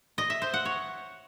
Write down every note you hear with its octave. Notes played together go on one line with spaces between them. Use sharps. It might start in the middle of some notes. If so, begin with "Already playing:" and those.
D#5
E5
C5
F#5
C#5